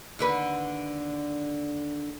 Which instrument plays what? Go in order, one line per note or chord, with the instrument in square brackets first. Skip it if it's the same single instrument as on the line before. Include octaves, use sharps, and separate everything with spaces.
[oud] D#2 D3 B4